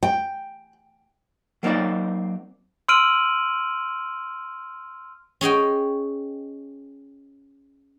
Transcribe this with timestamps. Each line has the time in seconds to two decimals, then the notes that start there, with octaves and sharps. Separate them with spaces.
0.03 G5
1.63 F#3 A#3 C4 D#4 D5
2.89 C6 E6 F6 D7 D#7 F#7
5.41 C#4 G#4 D#5 G5